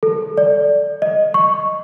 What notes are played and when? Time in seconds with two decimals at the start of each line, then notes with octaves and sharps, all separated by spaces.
0.03 A4
0.38 D5
1.02 D#5
1.34 C#6